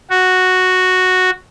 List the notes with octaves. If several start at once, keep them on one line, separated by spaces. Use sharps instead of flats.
F#4